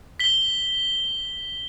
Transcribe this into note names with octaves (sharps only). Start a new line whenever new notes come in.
B6 G7